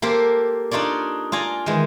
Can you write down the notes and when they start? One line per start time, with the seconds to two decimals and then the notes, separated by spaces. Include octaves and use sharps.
0.02 A#3 G4 A4 A#4 C5
0.71 D4 D#4 F4 C#5 D5
1.32 F4 D5 G#5 A#5
1.66 D#3 E3 G#3